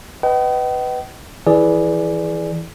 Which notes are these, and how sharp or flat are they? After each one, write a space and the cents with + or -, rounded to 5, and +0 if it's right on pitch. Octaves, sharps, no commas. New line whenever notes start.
B4 +15 D#5 +0 G5 -45
E3 -5 G#4 +15 D5 +0